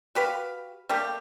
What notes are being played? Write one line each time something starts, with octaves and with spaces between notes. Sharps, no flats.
F#4 G4 B4 F5
G3 A3 A#3 G4